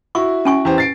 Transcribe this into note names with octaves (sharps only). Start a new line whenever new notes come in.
E4 F#4 C#6
C#4 G#5 C#6
E2 G4 C5
A6 C7 D7